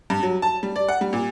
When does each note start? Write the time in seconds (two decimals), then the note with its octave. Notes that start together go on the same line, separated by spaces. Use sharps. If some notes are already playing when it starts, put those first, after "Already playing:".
0.10 G2
0.23 F#3
0.42 A5
0.63 G3
0.76 D5
0.89 F#5
1.01 G3
1.13 A#2